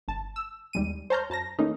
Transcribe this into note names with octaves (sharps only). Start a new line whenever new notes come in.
G1 A5
E6
D#2 G3 G#3 D#7
C5 C#5 A5 A#5 F6 G6
F#2 A5 A#5 A#6
E3 A3 A#3 C#4 D#4